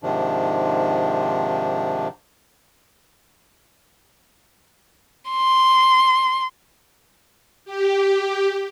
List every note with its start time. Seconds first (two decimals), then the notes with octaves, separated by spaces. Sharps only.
0.03 G#2 C3 D#3 F3 D4
5.29 C6
7.65 G4